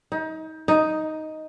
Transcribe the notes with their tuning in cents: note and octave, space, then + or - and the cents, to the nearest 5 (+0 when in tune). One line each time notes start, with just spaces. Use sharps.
D#4 +30
D#4 +5